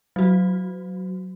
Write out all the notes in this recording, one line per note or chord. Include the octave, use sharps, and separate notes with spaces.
F#3 F#4